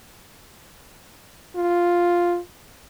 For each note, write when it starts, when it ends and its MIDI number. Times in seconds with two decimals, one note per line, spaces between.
1.56 2.39 65